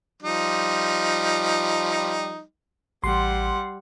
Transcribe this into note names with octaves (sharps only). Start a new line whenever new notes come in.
F3 G3 D#4
A1 G3 F#5 C6